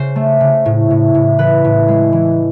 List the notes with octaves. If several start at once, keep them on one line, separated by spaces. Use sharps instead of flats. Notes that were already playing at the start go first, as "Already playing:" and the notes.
Already playing: C#3 C5
A3
C#3
A2
A2
A2
E3 B4
A2
G#3
E3